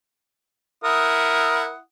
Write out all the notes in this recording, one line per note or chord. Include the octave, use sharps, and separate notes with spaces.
E4 A#4 F#5 D#6